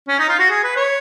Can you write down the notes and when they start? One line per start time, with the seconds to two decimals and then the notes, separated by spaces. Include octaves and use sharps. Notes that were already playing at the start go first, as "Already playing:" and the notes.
0.08 C#4
0.19 D#4
0.29 F4
0.39 F#4
0.50 G#4
0.64 B4
0.76 C#5